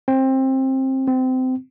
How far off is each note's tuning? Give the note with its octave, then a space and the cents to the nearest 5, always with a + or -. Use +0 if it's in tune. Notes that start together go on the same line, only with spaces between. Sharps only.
C4 +20
C4 -25